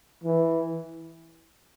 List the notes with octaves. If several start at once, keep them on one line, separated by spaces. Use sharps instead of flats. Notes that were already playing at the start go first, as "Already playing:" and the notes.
E3